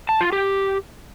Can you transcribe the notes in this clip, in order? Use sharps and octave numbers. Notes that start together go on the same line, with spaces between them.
A5
F4
G4